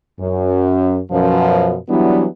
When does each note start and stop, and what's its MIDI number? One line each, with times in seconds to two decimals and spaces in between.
0.20 0.98 42
1.11 1.76 42
1.11 1.76 47
1.11 1.76 53
1.89 2.25 52
1.89 2.25 54
1.89 2.25 55
1.89 2.25 59
1.89 2.25 62
1.89 2.25 64